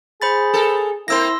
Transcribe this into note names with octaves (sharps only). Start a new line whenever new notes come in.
G#4 C5 B5 A6
A4 A#4
A#3 C4 E4 A#4 C6 E6 A#6